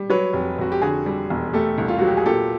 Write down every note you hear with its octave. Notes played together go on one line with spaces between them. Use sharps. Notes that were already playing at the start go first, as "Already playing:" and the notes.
Already playing: G3
F#3 B4 C#5
F1
F1 F#4
G4
D3 F#4 G#4
G3
E1
A3 G4 A4
C2
F4
F#3 F#4
G4
G#4
A#2 G4 A4